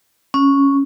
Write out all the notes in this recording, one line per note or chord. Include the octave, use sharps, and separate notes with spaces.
C#4